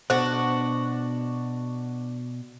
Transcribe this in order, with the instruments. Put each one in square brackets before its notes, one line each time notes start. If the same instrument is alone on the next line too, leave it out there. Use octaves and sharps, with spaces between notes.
[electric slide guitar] B2 [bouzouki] D4 F#4 [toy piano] C5